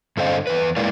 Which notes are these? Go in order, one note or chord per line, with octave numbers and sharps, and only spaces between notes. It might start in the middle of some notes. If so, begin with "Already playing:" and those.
G2 D3 A4 C5 D#5 F5
E2 B4
A#2 G#3 E4 A#4 D5 F5